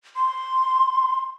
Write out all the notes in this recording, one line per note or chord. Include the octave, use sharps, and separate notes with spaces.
C6